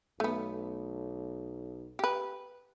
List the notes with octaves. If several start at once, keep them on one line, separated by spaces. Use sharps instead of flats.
B1 A3 B3
G4 B4